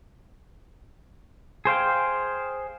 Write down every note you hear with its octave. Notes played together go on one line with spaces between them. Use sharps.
G#4 C5 F5 G5